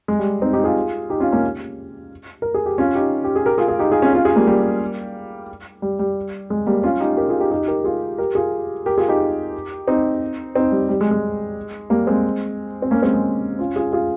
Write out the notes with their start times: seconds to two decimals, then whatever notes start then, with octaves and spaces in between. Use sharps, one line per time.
0.08 G#3
0.19 G3
0.41 C4 D#4
0.53 D#4 G4
0.64 F4 G#4
1.09 D#4 G4
1.20 C#4 F4
1.32 A#3 C#4
2.42 A#4
2.54 G#4
2.66 G4
2.78 C#4 F4
2.95 D#4 G4
3.24 G4
3.36 G#4
3.46 G4 A#4
3.58 F4 G#4
3.68 F4 G#4
3.79 D#4 G4
3.90 F4 G#4
4.02 C#4 F4
4.14 C#4 F4
4.25 F4 G#4
4.36 G3 A#3
4.47 G3 A#3
5.82 G3
5.99 G3
6.50 G#3
6.67 G3 A#3
6.83 C#4 F4
7.00 D#4 G4
7.17 G4 A#4
7.29 F4 G#4
7.40 D#4 G4
7.51 D#4 G4
7.67 G4 A#4
7.84 F4 G#4
8.18 G4 A#4
8.35 F4 G#4
8.86 G4 A#4
8.98 F4 G#4
9.08 D#4 G4
9.88 C4 D#4
10.55 C4 D#4
10.71 G3
10.89 G3
11.01 G#3
11.11 G#3
11.90 G3 A#3
12.07 G#3 C4
12.82 C4
12.91 A#3 C#4
13.02 G#3 C4
13.14 G#3
13.59 C#4 F4
13.76 F4 G#4
13.92 F4 G#4